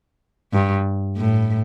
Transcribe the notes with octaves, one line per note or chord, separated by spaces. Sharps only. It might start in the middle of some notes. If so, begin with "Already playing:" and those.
G2
A2